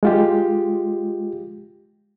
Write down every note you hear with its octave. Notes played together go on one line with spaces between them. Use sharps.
G#3 F4 G4